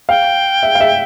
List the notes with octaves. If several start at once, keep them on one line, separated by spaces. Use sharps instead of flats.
F5 G5
E5
F5
E5